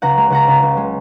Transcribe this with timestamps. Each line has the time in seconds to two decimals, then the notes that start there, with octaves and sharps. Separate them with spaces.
0.02 C#2 F#5 A#5
0.17 G#3
0.30 C#2 F#5 A#5
0.48 C#3
0.63 C#2
0.77 G#3